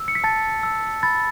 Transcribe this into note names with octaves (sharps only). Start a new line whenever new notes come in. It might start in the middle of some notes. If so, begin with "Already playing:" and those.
Already playing: E6
C#7
B6
A5 A6
E6
B5 A6